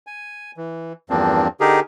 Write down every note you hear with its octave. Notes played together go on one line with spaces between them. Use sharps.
G#5
E3
E2 G2 F3 A#3 C4 D4
D3 D#4 G4 G#4 A#4